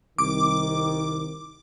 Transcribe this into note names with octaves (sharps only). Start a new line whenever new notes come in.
C2 D#3 D6